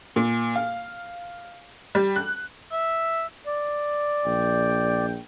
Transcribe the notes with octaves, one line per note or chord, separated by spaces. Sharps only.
A#2
F5
G3
F#6
E5
D5
A#1 G5